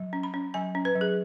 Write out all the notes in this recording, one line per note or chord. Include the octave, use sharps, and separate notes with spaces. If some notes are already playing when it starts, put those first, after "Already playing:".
Already playing: F#3
C#4
B5
C#4
F#3 G#5
C#4
B4
F#3
G#4